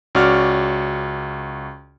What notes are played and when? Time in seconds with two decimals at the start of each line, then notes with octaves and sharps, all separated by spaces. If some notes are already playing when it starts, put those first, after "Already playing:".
0.15 C#2 C#4 F#4 D5 F6